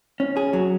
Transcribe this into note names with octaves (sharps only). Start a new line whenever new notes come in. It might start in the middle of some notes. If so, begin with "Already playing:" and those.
C#4
G#4
F#3